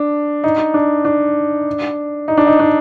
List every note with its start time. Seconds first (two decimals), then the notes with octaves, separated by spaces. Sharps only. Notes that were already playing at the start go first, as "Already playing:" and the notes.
Already playing: D4
0.44 D#4
0.74 D4
1.05 D4
2.28 D#4
2.38 D4
2.47 D#4
2.60 D4